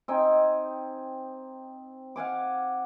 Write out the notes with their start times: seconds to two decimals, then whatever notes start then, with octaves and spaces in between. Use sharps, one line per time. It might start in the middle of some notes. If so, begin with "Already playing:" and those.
0.08 C4 D#4 G5 G#5
2.16 F5 F#5 G#5 D6